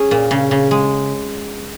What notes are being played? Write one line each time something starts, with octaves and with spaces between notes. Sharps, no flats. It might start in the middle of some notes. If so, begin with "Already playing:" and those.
Already playing: C#4 G#4
A#2
C#3
C#3
G#3